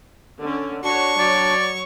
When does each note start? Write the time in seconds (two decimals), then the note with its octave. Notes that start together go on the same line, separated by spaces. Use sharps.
0.41 D3 C#4
0.84 D4 F#4 C#5 C#6
1.19 F#3 C#5 D5